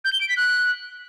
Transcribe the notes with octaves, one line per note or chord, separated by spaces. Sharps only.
G6
G7
D7
B6
F#6